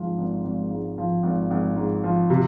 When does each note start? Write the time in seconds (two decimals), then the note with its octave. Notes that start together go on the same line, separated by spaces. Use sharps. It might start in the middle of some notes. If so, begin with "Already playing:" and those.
Already playing: G#1 G#2 F3
0.18 G#1
0.44 G#1
0.71 G#2
0.98 F3
1.23 G#1
1.51 G#1
1.76 G#2
2.04 F3
2.30 C3